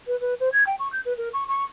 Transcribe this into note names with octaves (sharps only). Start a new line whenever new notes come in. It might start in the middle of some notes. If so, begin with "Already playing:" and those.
B4
B4
C5
G#6
G5
C#6
G6
B4
A#4
C#6
C#6